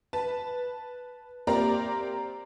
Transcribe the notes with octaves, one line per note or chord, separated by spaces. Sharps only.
B4 A5
A#3 C4 G4 A#4 D5 A#5